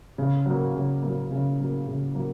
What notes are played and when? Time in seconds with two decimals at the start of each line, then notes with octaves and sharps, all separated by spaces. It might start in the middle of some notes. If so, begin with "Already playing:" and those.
0.18 C#3
0.46 F#3 A#3
0.75 C#3
1.03 F#3 A#3
1.31 C#3
1.59 F#3 A#3
1.87 C#3
2.15 F#3 A#3